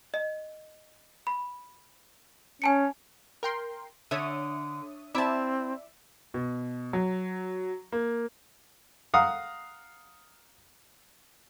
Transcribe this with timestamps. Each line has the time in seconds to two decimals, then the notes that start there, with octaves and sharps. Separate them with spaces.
0.14 D#5
1.27 B5
2.62 C#4 G#5 A5 C#7
3.43 A#4 G5 C6
4.11 D3 C#5 E5 D#6
5.15 C4 E4 D5 E5 A5
6.34 B2
6.93 F#3
7.92 A#3
9.14 F5 F#5 A#5 D#6